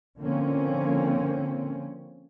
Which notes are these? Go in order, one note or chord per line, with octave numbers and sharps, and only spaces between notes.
D3 F3 A#3 C4 C#4